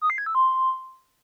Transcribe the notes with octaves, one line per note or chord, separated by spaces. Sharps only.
D#6
C7
G#6
E6
C6